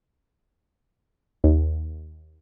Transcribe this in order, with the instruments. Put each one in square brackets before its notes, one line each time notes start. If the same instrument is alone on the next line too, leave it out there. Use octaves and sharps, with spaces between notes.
[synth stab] D#2